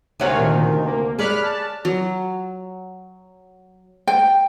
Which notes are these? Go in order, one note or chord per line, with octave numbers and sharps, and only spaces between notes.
D2 C3 A#4 C#5 F5 F#5
A#2 D#3
D#3
A#3
G#4 C#5 D5 B5 F6 F#6
A5
F#3
G5